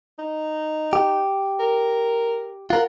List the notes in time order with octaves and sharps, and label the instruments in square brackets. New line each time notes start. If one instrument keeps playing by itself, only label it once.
[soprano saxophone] D#4
[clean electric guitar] G4
[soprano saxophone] A#4
[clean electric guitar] F4 A#4 [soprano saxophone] F#5